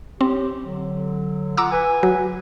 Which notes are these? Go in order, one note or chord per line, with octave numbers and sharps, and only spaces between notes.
A2 C4 G4
D3 F#3
F4 F#5 A#5 D6 E6
B4 G#5
F#3